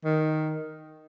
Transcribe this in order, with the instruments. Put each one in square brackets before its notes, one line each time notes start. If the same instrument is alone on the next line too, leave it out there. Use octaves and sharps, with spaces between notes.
[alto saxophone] D#3